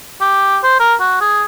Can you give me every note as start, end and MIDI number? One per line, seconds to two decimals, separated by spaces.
0.21 0.59 67
0.63 0.77 72
0.80 0.94 70
1.00 1.21 66
1.21 1.45 68